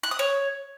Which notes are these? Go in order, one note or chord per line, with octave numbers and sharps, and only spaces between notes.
F#6
D#6
C#5